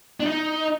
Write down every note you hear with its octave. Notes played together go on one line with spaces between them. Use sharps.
D4
D#4